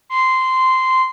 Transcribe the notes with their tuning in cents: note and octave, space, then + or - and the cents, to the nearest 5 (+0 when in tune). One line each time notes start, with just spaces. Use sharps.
C6 -10